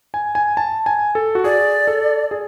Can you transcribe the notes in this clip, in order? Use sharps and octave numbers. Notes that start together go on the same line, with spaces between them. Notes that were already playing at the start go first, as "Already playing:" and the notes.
G#5
G#5
A5
G#5
A4
F#4
G#4 D5
A4
G#4